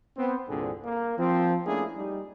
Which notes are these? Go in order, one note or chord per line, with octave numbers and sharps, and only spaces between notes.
B3 C4 C5
C2 G2 A#2 D3 C4 G#4
A#3
F3 C4
A3 A#3 C#4 D4 E4 G#4
G3 D#4